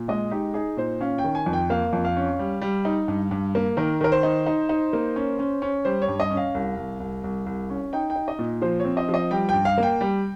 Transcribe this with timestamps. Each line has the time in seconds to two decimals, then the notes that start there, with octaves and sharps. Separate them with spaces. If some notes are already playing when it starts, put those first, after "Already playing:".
Already playing: A#2
0.08 G#3 D#5
0.31 D#4 G4
0.54 D#4 G#4
0.77 A#2 C5
1.01 C#4 F5
1.18 G5
1.24 D#3
1.35 G#5
1.46 F2
1.53 G5
1.70 A#3 F5
1.93 F2
2.05 F5
2.17 C#4
2.39 G3
2.61 G3
2.85 D#4
3.08 G2
3.31 G2
3.55 A#3
3.77 D#3 A#4
4.01 D#3 A#4
4.12 C5
4.23 D#4
4.47 D#4
4.69 D#4
4.93 A#3
5.16 C#4
5.39 C#4
5.62 C#4
5.85 G3 C5
6.02 C#5
6.08 G2
6.20 D#5
6.31 C#4
6.37 F5
6.55 C2
6.77 C2
7.00 C2
7.24 C2
7.46 C2
7.70 C#4
7.93 D#4 G5
8.10 G5
8.15 D#4
8.28 D#5
8.39 A#2
8.62 F3 C5
8.80 C4 C#5
8.97 D#5
9.09 F3
9.14 D#5
9.31 G3 G5
9.49 G5
9.54 G2
9.65 F5
9.78 A#3
9.83 G5
10.01 G3